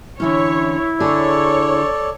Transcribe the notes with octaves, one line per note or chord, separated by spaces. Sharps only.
D3 E3 C#4 E4 C#5
D3 G#4 A4 C#5 D5